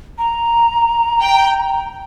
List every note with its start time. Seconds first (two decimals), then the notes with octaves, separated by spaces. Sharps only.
0.18 A#5
1.22 G5